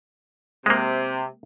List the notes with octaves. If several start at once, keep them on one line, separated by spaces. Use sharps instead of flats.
C3 G#3 A#3